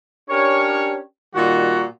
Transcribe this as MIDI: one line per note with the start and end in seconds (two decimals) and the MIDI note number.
0.29 0.98 61
0.29 0.98 62
0.29 0.98 67
0.29 0.98 70
0.29 0.98 73
1.35 1.83 46
1.35 1.83 51
1.35 1.83 55
1.35 1.83 66